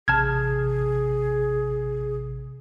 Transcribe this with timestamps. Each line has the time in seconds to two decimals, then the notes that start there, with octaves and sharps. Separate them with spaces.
0.08 A1 C3 G#4 A5 F6 G#6